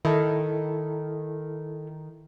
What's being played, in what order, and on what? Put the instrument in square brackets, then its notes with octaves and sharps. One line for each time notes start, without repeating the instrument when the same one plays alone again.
[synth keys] D#3 [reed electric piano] E4 A4